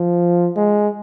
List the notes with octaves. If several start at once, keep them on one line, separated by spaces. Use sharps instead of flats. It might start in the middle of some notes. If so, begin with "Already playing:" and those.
Already playing: F3
G#3